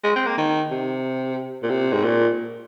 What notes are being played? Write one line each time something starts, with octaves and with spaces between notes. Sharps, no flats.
G#3
C4
A#3
D#3
C3
A#2
C3
G#2
A#2